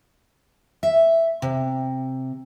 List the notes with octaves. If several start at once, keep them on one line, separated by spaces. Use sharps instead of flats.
E5
C3